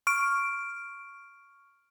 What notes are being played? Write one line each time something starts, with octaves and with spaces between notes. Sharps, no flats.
C#6 F6 D7